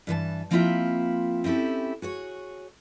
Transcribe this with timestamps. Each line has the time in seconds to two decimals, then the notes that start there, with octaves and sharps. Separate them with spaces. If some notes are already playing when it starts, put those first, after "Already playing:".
0.07 G2 E3 B4 A5
0.51 F3 A#3 C4 E4 F4 E5
1.44 C4 C#4 E4 G4 A4
2.02 F#4 G#4 C#5